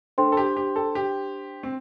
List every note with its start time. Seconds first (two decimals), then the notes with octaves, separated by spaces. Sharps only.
0.18 A3 D4 C5 G5 C6
0.32 A4
0.37 G4
0.57 G4
0.76 A4
0.95 G4
1.63 C4